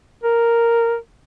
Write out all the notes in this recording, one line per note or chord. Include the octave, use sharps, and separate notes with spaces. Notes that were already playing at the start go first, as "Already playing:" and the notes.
A#4